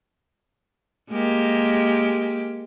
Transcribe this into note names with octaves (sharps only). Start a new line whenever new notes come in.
G#3 A#3 G4